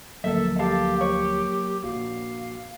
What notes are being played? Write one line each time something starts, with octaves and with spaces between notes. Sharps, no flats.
D2 F3 F#3 A#3 A4 A#4 E5
G4 A4 F5
C#5
A#1 F4 F#4 F5 D6